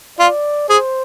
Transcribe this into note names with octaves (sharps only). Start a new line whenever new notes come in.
F4 D5
G#4 C5